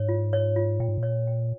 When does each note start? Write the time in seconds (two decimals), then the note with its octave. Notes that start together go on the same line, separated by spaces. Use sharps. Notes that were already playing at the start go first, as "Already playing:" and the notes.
Already playing: G#2 C#5
0.09 F4
0.33 C#5
0.56 F4
0.80 A#2 G5
0.88 G#2
0.98 A#2
1.03 C#5
1.27 G5